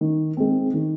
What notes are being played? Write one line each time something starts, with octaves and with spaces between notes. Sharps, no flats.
D#3
G#3 C4
D#3